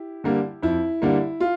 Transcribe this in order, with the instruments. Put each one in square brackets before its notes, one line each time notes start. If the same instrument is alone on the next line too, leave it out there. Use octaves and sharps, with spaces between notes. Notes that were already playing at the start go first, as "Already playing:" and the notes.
Already playing: [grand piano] E4 G4
D3 G3 A#3
F2 E4
D3 G3 A#3
F4